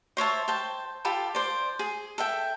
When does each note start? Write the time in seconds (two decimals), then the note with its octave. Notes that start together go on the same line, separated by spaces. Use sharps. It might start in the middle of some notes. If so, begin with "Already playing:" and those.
0.17 C5 C#5 E5 A5
0.48 C5 G5 A5
1.05 F4 G4 A4 B5
1.35 C5 D5
1.79 G#4
2.18 A4 E5 G5